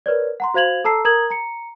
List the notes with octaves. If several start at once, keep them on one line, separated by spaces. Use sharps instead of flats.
A#4 B4 C#5 D5
F#5 A#5 C6
F#4 C5 F5 G#6 F7 F#7
A4 A5 A#5 E6 C7
A#4 A#5 D#6 G#6 F#7
A#5 C#7